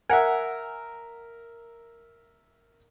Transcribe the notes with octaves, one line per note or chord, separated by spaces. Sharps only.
A#4 E5 F#5 G#5